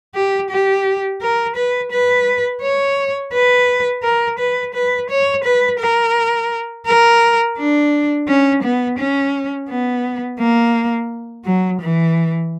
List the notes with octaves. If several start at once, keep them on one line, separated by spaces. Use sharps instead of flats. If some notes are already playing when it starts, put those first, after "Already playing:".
G4
G4
A#4
B4
B4
C#5
B4
A#4
B4
B4
C#5
B4
A#4
A#4
D4
C#4
B3
C#4
B3
A#3
F#3
E3